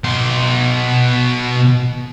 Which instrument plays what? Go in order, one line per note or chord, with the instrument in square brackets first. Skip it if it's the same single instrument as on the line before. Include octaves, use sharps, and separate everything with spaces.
[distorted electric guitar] B2 C6